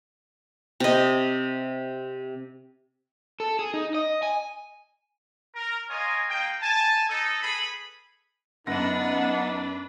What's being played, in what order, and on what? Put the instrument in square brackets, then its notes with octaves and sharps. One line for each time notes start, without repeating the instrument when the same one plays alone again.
[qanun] C3 D#5
[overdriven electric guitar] A4
G#4
D#4
D#5
G#5
[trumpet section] A#4
F4 A#4 C#5 D#5 G#5
G#3 A#3 G5
G#5 A5
D#4 A4
G#4 A4 B4 B5
[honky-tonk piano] F#2 A#6 [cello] B3 F#5 [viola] D4 B4 [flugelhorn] D#4